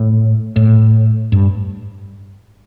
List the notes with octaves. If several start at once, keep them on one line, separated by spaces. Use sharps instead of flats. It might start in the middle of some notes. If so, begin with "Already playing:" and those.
Already playing: A2
A2
G2